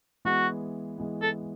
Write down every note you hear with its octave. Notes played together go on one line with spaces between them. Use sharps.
E3 G#3 B3 F#4
E3 G#3 B3
A4